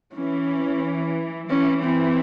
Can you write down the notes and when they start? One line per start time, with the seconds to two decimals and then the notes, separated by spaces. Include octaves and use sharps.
0.14 E3 C#4
1.49 E3 C#4
1.83 C4